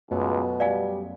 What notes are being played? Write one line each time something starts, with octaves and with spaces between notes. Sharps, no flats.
C#2 F#2 B2 A3 B3
G3 D5 F5 G#5